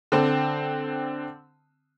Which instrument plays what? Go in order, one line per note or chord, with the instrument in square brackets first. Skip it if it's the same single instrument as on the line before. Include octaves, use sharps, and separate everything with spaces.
[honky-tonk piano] D3 C4